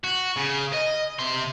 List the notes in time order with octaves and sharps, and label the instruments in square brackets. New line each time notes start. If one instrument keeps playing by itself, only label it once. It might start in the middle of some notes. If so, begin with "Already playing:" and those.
[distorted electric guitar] F#4
C#3
D#5
C3 C6